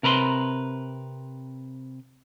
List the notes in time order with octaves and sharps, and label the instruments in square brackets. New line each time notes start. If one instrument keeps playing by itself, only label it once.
[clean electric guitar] C3 A#4 B4 A#5 C6